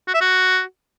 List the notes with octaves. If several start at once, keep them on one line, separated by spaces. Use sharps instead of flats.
F#4
E5
F#4